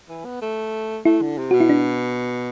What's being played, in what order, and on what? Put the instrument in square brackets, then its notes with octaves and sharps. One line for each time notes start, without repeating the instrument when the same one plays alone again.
[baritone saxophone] E3
B3
A3
[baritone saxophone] A3 [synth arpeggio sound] E4
[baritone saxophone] D3
C3
[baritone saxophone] B2 [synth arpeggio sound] F#4
[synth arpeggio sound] E4
D4